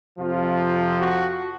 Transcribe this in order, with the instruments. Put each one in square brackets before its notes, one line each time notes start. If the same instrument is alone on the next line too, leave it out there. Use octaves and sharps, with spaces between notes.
[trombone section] F2 C3 F3 F4
F#4